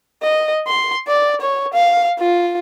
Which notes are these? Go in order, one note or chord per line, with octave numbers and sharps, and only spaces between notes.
D#5
C6
D5
C#5
F5
F4